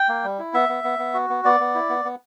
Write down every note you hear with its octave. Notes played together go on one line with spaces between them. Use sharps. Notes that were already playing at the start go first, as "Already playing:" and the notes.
Already playing: G5
A#3
G3
E4
B3 E5
B3
B3
B3
F#4
B3
B3 D5
B3
E4
B3
B3